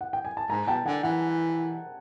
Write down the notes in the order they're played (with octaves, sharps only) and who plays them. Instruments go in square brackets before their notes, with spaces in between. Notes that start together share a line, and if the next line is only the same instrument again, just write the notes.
[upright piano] F#5
G5
G#5
A5
[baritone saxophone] G#2 [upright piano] G#5 A#5
[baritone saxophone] B2 [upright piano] G5 A5
[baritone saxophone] D3 [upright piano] F#5 G#5
[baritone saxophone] E3 [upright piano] F#5 G#5